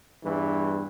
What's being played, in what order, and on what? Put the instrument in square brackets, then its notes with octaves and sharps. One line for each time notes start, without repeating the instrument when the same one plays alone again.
[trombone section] E2 G2 E3